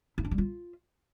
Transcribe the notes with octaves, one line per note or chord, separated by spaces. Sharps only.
E4
D4
G3
F4